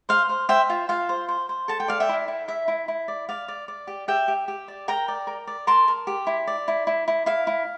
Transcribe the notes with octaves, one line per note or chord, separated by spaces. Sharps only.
C5 F5
C5
C5 E5 G5
F4
F4 F5
C5
C5
C5
A4 A5
G5
D5 F5
E5 G5
E4
E4
E4 E5
E4
E4
D5
D5 F5
D5
D5
G4
G4 E5 G5
G4
G4
D5
A#4 G5 A#5
D5
A#4
D5
A#4 A5 C6
A#4
G4
E4
D5
E4
E4
E4
E4 F5
E4